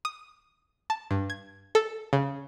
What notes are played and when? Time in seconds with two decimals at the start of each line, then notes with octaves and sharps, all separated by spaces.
0.05 D#6
0.90 A5
1.11 G2
1.30 G#6
1.75 A4
2.13 C#3